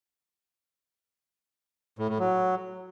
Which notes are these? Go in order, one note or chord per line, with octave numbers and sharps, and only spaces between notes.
A2
A2
F#3